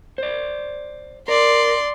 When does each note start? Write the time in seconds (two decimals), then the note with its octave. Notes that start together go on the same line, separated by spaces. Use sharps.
0.18 C5 D5
1.28 A#4 D5 C6